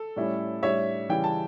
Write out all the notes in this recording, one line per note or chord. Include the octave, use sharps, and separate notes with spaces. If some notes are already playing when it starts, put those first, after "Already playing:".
Already playing: A4
A2 G3 C#4 E4
A2 G3 D4 C#5 E5
C#3 E3 G3 C#4 G5
A5